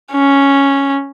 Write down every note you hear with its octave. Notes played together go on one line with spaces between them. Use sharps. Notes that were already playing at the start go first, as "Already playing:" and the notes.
C#4